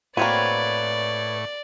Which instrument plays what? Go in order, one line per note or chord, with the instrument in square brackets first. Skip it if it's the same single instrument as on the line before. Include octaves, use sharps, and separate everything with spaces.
[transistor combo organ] A2 C#6 [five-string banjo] A#3 C4 F#4 [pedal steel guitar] B4 C#5 [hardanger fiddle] D5